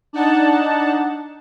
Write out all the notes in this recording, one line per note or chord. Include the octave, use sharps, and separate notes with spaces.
D4 D#4 F#5 A5